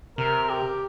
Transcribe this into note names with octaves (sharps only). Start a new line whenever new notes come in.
C3 A#4
G4